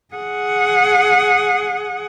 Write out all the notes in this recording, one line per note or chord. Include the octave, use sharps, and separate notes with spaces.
G#4 F#5